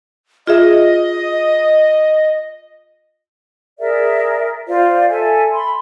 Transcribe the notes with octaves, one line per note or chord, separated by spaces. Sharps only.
F4 G#4 D#5 E5
G#4 A#4 D5 E5
F4 C5 D5
A4 E5 G#5
B5 C6